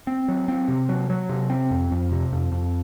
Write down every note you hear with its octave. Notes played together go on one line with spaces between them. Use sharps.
C4
F#3
C4
C3
F#3
F#3
C3
C4
F2
F2
C3
F2
F2